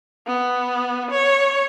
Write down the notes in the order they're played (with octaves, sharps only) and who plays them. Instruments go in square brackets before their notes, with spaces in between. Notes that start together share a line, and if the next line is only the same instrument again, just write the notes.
[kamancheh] B3
C#5